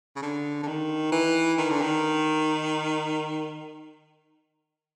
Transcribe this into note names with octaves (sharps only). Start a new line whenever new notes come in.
C#3
D3
D3
D#3
E3
D#3
D3
D#3